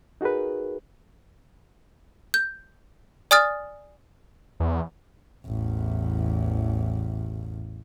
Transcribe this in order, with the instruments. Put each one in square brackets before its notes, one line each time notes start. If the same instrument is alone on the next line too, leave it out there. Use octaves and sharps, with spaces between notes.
[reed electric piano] D#4 F#4 G#4 A#4 B4
[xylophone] G6
D5 G#5 D#6 F6 A6
[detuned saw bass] E2
[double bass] A1 E2